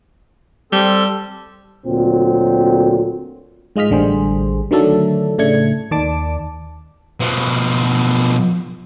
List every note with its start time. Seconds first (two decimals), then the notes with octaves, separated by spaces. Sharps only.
0.72 G3 C4 A4 E6
1.86 D2 A#2 F#3 C4
3.76 G#2 G#3 F4 D#5 F6 B6
3.91 A1 D3 G3 G#4 C5
4.71 D3 D#3 F#3 A3 D4 A4
5.38 A2 C#3 A3 D4 G#6 C#7
5.91 D#2 D#3 D5 A5 D6
7.20 B2 F3